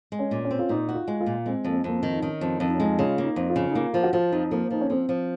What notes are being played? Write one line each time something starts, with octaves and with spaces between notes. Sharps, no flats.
G#3
C#4
A#2
C#4
C4
F4
A#2 D#4
F#4
F4
G#3
F4
A#2
G#3 C4
F2 A#3
C4
F2 A#3
C4
D#3
D#4
D#3 C#4
F2
F2 F4
D#4
C#4
G#3 D#4
C#3 F4
A#3
D#4
F2
F4
C#3
D#4
A#3 F4
F3 F4
F#4
F3 F4
F2 D#4
F3 A#3
F3 D#4
C#4
F3 C4
F3